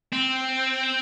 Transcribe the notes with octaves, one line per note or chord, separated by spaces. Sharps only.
C4